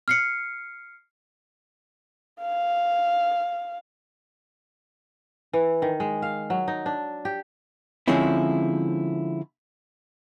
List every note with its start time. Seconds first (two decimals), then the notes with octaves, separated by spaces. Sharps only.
0.08 F6 C7 C#7
2.41 F5
5.53 E3
5.82 D#3
6.00 G#3
6.22 F5
6.50 F#3
6.68 D#4
6.86 D4
7.25 G4
8.08 D3 F3 G#3 C4 C#4 E4